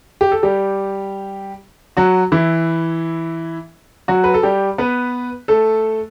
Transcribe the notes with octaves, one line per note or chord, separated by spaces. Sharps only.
G4
A4
G3 G4
F#3 F#4
E3 E4
F#3 F#4
B4
A4
G3 G4
B3 B4
A3 A4